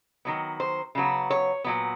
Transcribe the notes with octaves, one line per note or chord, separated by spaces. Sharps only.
D#3 F#3 B3
C5
C#3 F#3 B3
C#5
A#2 F#3 B3